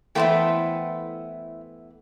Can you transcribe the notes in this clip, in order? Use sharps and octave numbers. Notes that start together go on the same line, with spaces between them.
E3 A3 B3 E4 C5 G5